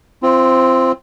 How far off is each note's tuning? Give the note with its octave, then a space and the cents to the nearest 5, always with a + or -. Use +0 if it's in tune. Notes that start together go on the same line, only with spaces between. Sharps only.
C4 +0 F4 -30